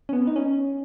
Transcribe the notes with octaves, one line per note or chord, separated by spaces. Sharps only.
C#4
B3
D#4
C#4